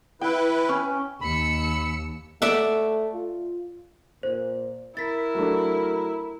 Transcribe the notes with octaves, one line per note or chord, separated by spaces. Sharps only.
E4 B4 G5
C#4
D#2 B5 E6 C#7
A3 D5 E5 F#5
F4
A#2 C5
E4 A#4 A6 B6
F#3 A3 D4